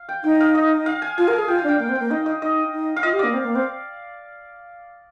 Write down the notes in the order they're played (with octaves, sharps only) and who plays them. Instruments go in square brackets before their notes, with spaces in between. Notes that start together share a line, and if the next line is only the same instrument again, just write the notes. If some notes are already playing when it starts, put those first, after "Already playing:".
Already playing: [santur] F5
G5
[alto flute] D#4 [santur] G5
[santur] F5
D#5
F5
G#5
[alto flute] F4 [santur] G#5
[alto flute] A#4
[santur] G#5
[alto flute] G#4
[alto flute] F4 [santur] G5
[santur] F5
[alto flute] D4 [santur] G5
[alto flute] A#3 [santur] G5
[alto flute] C4
[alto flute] A#3 [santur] G5
[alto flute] D#4 [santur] D#5
[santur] D#5
[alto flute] D#4 [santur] D#5
[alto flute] D#4
[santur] F5
[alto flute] F4 [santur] D#5
[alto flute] G4
[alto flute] A#3 [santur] D5
[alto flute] C4
A#3
C4